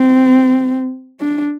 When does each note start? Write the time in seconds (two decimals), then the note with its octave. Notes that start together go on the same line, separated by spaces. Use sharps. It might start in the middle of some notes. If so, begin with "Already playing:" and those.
Already playing: C4
1.20 D4